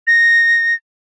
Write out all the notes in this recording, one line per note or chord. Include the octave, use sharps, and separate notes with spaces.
A#6